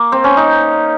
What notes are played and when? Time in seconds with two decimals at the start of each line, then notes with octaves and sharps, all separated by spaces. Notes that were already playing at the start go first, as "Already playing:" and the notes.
Already playing: A#3
0.12 C4
0.24 C#4
0.37 D#4